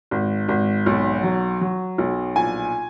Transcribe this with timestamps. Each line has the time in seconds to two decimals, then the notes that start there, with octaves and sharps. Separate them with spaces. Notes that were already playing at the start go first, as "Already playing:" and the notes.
0.11 G#1
0.48 G#1
0.86 B1
1.23 F#3
1.61 F#3
1.98 B1
2.36 A#1 G#5